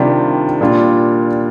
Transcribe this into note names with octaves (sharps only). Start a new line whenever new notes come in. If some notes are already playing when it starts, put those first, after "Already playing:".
Already playing: C3 D#3 G3 D4 F4
A#2 G3 D4 F4